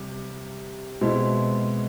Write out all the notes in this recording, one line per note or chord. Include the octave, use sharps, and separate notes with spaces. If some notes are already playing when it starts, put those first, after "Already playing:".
Already playing: C3 G3
B2 G#3 C4 E4